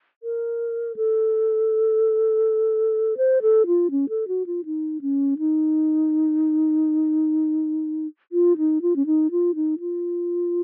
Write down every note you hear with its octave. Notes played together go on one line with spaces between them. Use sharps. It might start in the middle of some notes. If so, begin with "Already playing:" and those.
A#4
A4
C5
A4
F4
C#4
A4
F#4
F4
D#4
C#4
D#4
F4
D#4
F4
C#4
D#4
F4
D#4
F4